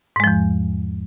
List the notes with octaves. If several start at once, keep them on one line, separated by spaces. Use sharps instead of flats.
E2 G#2 F3 G#3